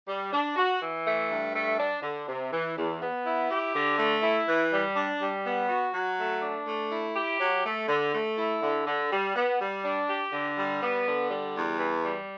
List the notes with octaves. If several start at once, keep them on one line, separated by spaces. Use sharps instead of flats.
G3
D4
F#4
E3
A3
G2
A3
D4
D3
C3
E3
E2
B3
E4
G4
D3
A3
E4
E3
G3
D4
G3
B3
F#4
F#3
A3
D4
A3
E4
G4
F#3
A3
D3
A3
E4
D3
D3
G3
B3
G3
D4
G4
D3
G3
B3
D3
G3
E2
E3
G3